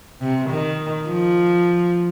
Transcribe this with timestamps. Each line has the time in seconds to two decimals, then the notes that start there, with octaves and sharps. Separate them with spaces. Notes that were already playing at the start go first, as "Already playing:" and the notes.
0.21 C3
0.50 D#3
1.07 F3